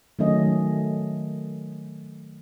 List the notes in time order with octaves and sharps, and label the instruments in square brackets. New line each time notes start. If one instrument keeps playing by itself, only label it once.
[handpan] D#3 F#3 A3 C#4 D#5